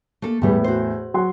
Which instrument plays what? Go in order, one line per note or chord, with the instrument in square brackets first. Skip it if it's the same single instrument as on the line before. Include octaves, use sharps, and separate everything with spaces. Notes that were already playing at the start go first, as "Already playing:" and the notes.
[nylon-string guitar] A3 A#3 A4
[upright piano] E2 A2 B3 [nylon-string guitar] G3 A3
[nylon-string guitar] F#4 C5
[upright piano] F#3 F#5 C6